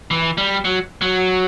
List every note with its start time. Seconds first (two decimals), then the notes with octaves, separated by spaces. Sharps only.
0.11 E3
0.38 G3
0.65 F#3
1.01 F#3